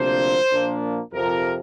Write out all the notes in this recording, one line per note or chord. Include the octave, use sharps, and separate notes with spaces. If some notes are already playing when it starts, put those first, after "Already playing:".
Already playing: D2 C3 F3 A#3 D4 C5
A#2 F3 A#3 D4
F2 C3 F3 A#4